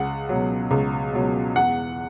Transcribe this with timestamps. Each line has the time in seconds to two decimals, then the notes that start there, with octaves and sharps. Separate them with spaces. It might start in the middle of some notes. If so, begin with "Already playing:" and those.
Already playing: C#2 F#5
0.29 B2 F#3
0.71 C#2
1.13 B2 F#3
1.56 E2 F#5